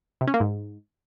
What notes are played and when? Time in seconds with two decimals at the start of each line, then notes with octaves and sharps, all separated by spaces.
0.21 C3
0.27 C#4
0.34 A#3
0.40 G#2